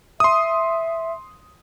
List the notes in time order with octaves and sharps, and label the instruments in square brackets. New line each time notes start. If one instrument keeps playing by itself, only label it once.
[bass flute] E5 [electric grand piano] C6 D#6